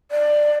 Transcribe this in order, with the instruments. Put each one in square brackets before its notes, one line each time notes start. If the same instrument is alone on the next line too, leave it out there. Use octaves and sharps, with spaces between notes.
[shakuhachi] D5